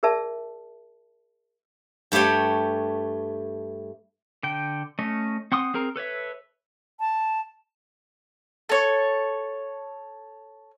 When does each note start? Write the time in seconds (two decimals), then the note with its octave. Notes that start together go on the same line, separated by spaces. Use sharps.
0.03 G#4 A#4 D5 E5 A5
2.12 G2 A3 G4 C#5 G5
4.43 D3 G5
4.99 A3 C#4 D#5
5.52 C4 F#5 C6 D#6
5.74 C4 G#4 A#4 A#5
5.96 A4 B4 C#5 E5
6.99 A5
8.69 A4 C#5